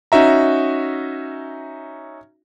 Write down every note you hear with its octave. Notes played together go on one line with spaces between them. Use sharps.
C#4 D#4 F#4 E5 A#5